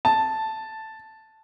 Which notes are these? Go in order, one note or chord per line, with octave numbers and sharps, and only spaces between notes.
A5